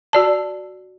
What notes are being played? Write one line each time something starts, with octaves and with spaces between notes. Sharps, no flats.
F#4 D5 A5